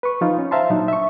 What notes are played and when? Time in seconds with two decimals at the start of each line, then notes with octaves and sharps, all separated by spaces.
0.03 B4 C#6
0.21 F3 D#4 F4
0.39 C#4
0.51 C5 E5 F5 A5 A#5 C6
0.70 A#2 F#3 D4 D#4
0.88 E5 C#6